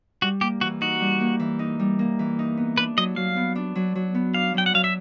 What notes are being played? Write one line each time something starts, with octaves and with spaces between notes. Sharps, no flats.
G3 F#4
A#3 G4
E3 F#4
D#4 F#4
G3
A#3
E3
D#4
G3
A#3
E3
D#4
B3
D4 B4
F#3 D#5
F#3 F5
B3
D4
F#3
F#3
B3
D4 F5
F#3 G5
F#5
F#3 F5
E5